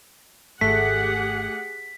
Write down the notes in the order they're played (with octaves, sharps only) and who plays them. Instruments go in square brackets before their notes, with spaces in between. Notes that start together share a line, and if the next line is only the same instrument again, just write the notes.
[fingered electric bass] G#1 [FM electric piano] A3 [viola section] G4 G#4 F#5 [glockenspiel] B6